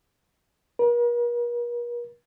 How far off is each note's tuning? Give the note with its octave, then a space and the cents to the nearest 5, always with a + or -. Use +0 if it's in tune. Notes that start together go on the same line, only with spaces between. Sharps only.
A#4 +45